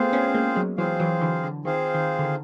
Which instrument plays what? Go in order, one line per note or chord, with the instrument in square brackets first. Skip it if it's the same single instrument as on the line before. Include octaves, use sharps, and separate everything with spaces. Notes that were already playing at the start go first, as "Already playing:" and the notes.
Already playing: [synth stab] A3 B3 [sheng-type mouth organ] C4 F4 G#4 C5 F5
[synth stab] B3 C#4
G#3 A#3
F#3 G#3
[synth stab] E3 F#3 [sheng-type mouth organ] C4 F4 G#4 C5 F5
[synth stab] E3 F#3
D3 E3
D3
[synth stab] D#3 [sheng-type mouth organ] C4 F4 G#4 C5 F5
[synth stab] D#3
D3
D#3